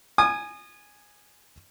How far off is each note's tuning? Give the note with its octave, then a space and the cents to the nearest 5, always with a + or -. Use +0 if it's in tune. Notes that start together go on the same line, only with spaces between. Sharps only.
G#5 +0 D#6 -30